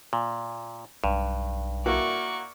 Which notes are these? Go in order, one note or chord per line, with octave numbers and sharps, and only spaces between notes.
A#2
B1 G2
A#3 E4 F#4 D5 C#6